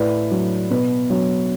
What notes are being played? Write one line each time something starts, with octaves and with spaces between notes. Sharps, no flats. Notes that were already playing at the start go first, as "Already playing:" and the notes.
Already playing: A2 B4 D5
F#3
B2 B4
F#3 C#5